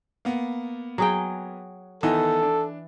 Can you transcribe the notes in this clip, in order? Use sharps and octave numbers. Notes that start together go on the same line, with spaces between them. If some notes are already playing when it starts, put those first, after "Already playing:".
A#3 B3
F#3 G#4 G5
D#3 E3 B3 D#4 A4
D4